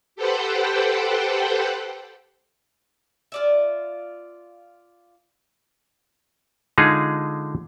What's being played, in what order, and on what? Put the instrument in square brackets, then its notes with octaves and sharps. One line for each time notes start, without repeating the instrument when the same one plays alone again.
[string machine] G4 A4 B4 C5 F#5 G5
[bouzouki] F4 D5 E5
[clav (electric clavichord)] D3 G#3 D#4 F4 G#4